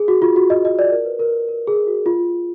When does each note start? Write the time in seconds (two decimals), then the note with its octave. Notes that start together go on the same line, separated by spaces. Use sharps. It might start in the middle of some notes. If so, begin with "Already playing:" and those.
Already playing: G#4
0.08 F#4
0.22 F4
0.36 F#4
0.50 D#5
0.65 D#5
0.79 D5
0.92 A#4
1.05 B4
1.19 A#4
1.49 A#4
1.67 G#4
1.87 F#4
2.06 F4